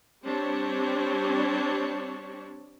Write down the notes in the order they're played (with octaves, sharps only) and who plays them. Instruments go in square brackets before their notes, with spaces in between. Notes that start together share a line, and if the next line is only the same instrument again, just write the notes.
[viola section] G3 C4 D4 G4 C#5